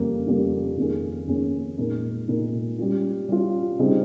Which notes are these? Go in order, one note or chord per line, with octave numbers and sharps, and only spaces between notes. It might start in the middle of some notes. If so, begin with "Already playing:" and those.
Already playing: F2 C#3 G3 A#3
F2 C#3 G3 A#3
F2 D#3 A#3 C#4 G#4
F2 D#3 A#3 C#4 G#4
A#2 G#3 D#4 A#4
A#2 G#3 D#4 A#4
G3 C#4 F4
G3 C#4 F4
C#3 G3 C4 D#4 G#4